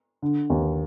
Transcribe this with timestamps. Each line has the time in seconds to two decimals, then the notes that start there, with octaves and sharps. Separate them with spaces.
0.22 D3
0.50 D#2